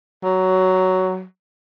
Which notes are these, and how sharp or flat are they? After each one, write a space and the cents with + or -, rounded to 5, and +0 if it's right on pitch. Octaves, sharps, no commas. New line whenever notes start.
F#3 +10